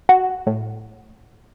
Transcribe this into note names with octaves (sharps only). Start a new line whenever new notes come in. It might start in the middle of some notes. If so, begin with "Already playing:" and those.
F#4
A2